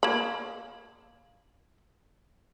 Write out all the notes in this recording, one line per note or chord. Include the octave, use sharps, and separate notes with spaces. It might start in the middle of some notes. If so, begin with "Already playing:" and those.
A#3 B5